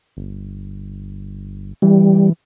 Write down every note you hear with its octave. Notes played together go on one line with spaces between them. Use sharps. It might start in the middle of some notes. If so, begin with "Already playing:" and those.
G1
E3 G3